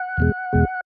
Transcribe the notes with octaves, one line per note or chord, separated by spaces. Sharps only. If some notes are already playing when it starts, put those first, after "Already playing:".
Already playing: F#5
E2 B2 G#3
E2 B2 G#3